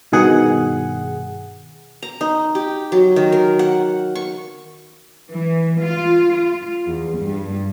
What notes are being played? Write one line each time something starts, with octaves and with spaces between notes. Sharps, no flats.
G2 B2 D#3 G#4 F#5
A#5
D#4
G4
F#3
D#3
A#4
F#5
C#6
E3
F4
F4
E2
G2